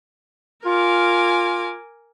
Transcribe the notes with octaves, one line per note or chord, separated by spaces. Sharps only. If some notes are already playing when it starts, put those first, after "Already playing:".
F4 A#4 G#5 D6